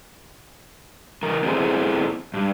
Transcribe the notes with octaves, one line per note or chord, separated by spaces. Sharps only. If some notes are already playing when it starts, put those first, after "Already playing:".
E3 A#4
B3 C4 E4 G#4 A4 C5
G2